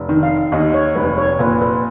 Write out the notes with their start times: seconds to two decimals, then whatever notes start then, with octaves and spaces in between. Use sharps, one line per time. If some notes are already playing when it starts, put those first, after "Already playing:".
Already playing: F1
0.09 D#3
0.23 F5
0.52 D#2 D#5
0.74 C#5
0.96 F1 B4
1.18 C#5
1.39 A#2 B4
1.62 B4